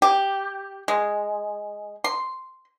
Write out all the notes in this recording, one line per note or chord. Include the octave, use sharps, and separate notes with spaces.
G4
G#3
C6